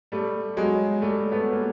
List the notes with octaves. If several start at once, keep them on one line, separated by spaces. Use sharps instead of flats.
G3 A3
F#3 G#3
G3 A3
A3 B3
A#3